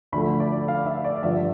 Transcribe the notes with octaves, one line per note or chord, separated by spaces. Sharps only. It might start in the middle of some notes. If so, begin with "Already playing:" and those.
D2 D3 F3 A3 B5
D5
F5
E5
D5
G2 D3 F3 E5